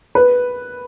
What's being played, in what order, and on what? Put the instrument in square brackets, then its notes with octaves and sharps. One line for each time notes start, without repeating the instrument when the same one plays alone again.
[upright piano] B4